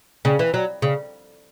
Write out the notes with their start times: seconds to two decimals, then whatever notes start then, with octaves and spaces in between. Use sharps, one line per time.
0.25 C#3
0.39 E3
0.54 F#3
0.82 C#3